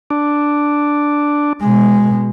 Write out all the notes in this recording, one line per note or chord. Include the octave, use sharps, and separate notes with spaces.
D4
B2 G#3